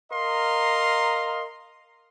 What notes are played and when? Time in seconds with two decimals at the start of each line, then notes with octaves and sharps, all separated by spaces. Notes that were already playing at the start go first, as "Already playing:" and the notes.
0.12 A#4 D#5 F5 A#5 C6